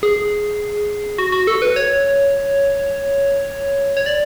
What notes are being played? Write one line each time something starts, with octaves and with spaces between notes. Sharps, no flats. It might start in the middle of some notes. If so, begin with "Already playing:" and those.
G#4
F#4
F#4
A4
B4
C#5
C#5
D5